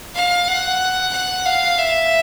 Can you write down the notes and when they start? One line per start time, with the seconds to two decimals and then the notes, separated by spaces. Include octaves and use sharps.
0.15 F5
0.48 F#5
1.13 F#5
1.46 F5
1.78 E5